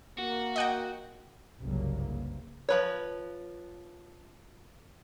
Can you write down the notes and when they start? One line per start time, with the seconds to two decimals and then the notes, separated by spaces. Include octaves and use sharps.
0.19 A#3 F#4
0.56 D#5 F#5 G5
1.61 F#1 C2 G2 C#3 F#3 A#3
2.69 F3 B4 C#5